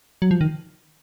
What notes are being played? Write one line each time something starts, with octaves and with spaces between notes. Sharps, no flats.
F#3
F3
D#3